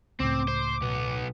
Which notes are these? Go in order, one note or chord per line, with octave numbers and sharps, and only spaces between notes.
C#2 A2 C4 D6
C5
B1 B3